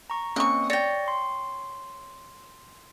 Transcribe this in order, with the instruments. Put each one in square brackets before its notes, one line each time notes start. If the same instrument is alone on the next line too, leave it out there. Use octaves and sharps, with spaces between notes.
[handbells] A#5 C#6
[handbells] A#3 C4 C#4 [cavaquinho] D#5 C#6
[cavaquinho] C#5 G5 [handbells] D5 A6 A#6
[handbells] C6